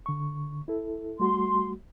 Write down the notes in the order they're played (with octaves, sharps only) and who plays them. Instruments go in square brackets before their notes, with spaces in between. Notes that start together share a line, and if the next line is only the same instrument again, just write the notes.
[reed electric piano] D3 C#6
E4 A4
[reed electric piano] G3 A3 F#4 [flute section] C6